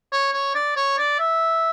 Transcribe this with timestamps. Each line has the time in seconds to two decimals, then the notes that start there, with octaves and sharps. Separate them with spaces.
0.12 C#5
0.33 C#5
0.55 D5
0.76 C#5
0.98 D5
1.19 E5